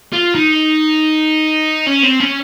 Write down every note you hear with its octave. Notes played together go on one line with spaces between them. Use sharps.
F4
D#4
C#4
C4
C#4